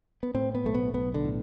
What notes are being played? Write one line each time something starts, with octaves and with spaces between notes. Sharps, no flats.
B3
A2 C4
B3
B1 A3
B3
B1 B3
D3
A2